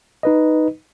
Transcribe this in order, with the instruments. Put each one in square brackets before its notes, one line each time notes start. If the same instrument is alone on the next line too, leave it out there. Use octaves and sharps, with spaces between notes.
[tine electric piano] D#4 B4 D#5